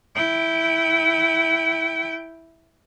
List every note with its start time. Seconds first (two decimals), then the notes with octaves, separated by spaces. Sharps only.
0.15 E4 G5